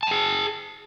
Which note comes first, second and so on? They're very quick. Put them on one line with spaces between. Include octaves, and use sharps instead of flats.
A5 G5 G#4